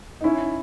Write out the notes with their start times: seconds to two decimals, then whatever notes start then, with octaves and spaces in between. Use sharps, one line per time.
0.21 D#4
0.24 C#4 E4